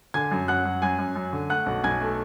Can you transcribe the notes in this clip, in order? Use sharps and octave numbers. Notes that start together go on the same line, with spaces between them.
D3 G#5 G#6
F#2
F#2 F#5 F#6
F#2
F#2 G#5 G#6
F#2
F#2
D3
A3 F#5 F#6
B1
B1 G#5 G#6
A3